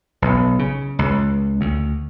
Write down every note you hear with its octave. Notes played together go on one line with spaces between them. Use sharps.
B1
C#3
C#2
D2